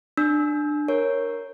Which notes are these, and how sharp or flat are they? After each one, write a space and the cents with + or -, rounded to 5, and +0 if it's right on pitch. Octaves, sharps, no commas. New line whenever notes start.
D4 +20 E6 -20
A#4 +0 C#5 -10